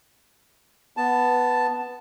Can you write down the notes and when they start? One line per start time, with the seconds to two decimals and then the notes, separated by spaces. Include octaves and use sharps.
0.97 B3 A5